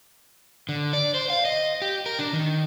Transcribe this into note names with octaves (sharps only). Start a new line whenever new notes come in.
D3
D5
C5
F5
D#5
G4
A#4
D4
D#3